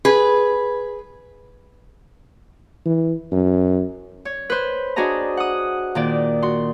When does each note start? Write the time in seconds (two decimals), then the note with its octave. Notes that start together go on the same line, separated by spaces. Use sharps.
0.05 G#4 B4
2.86 E3
3.32 F#2
4.25 C#5
4.50 B4 C5
4.96 D4 F#4 G#4 D#5 A#5
5.37 F#5 D#6
5.95 A#2 D#3 D5
6.42 F#4 C6